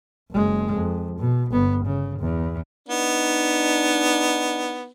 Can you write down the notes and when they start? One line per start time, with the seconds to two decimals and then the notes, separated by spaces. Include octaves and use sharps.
0.31 F#1 G#3
0.74 F2
1.19 B2
1.51 G1 B3
1.86 C#3
2.20 E2
2.89 B3 D4 D#4